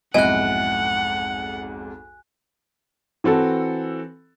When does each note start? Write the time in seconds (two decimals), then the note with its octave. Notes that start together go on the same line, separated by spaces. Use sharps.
0.14 B1 F2 G#2 E4 D#5 F#5 G#5 F#6
3.24 E3 C4 F#4 A4